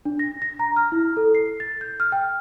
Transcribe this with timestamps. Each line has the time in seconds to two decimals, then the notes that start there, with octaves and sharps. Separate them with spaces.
0.05 D4
0.19 A#6
0.42 A#6
0.59 A#5
0.76 F6
0.92 E4
1.17 A4
1.35 C7
1.60 A6
1.81 G6
2.00 F6
2.12 G5